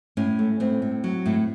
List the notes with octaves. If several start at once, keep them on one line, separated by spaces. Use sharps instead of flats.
A2 C#4
A3
A2 C4
A2
F#3
A2